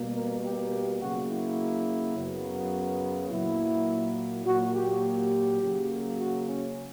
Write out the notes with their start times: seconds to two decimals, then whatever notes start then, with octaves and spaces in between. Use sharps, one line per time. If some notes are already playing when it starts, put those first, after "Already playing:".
Already playing: B2 G3 A#3
0.15 A#4
0.44 G4
1.00 C#3 F#3 A#3 F#4
1.30 E4
2.16 F#2 C#3 F#3 B3
3.30 A#2 F#3 A#3 E4
4.45 A#2 F#3 A#3 F#4
4.74 G4
5.02 G4
5.61 C#3 F#3 A#3
6.18 F#4
6.47 C#4